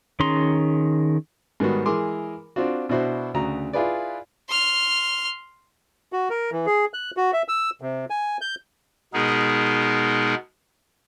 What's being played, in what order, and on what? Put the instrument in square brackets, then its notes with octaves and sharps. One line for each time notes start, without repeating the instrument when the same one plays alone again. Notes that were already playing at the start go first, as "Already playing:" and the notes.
[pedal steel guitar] D#3 C#4 G#4 A#5 C6
[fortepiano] G#2 D#3 G3 B3 F#4
E3 G#3 G#4 A#4 C6 D6
C4 D4 F4 F#4
B2 D4 E4 F#4 C5
D2 C#3 F#4 A#5
E4 F4 G#4 B4 D5
[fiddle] C6 F6
[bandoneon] F#4
A#4
E3
G#4
F#6
F#4
E5
E6
C3
G#5
G6
[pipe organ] B2 G#3 B3 D#4 G#4 A#4